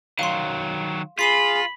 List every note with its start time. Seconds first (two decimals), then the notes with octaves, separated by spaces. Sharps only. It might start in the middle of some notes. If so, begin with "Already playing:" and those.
0.19 D#3 F#3 F5 C6
1.19 F4 G#4 B5 B6 C7 D#7